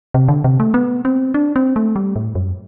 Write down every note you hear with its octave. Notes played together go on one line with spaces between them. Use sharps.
C3
D3
C3
A3
B3
C4
D4
C4
A3
G3
A2
F#2